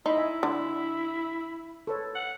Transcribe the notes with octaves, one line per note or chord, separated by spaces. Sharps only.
D#4 E4 D#5 B5 C6
E5 G#5
D3
A4 B4 C#5
F#5